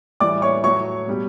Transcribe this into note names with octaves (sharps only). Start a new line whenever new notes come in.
A2 E3 G3 D5 D6
C#5 C#6
A2 F#3 C#5 C#6
B2 G3